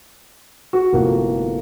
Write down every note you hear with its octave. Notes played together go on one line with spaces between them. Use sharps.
F#4 G#4
G1 A2 C3 F3 A#3 F#4